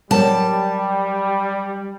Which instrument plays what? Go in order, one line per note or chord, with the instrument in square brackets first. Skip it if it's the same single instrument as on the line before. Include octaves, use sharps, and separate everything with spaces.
[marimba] F#3 A#4 C#5 [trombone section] G3 [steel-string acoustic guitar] A5